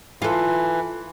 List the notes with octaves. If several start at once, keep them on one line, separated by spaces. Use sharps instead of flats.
E3 F4 A4